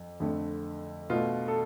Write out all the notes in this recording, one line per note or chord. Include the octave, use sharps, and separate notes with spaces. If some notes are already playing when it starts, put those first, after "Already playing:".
Already playing: F2
F2 D3 A3
B2 A3 F4
A4